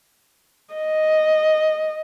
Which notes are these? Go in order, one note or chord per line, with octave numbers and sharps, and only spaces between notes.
D#5